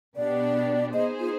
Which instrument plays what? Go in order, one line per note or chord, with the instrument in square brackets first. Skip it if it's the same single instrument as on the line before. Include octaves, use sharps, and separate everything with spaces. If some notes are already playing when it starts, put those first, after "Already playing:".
[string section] B2 B3 D4 G4 [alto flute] D5
[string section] B3 D#4 G#4 C5 [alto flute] D#5
[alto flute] F4